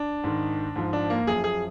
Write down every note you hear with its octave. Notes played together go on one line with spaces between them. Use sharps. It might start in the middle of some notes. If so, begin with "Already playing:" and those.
Already playing: D4
G#2 D#3
G#2 F3
D4
A#3
F#2 F3 G#4
G#4